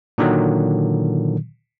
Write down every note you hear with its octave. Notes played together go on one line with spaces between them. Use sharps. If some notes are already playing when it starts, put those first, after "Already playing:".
A#2 D3 D#3 F#3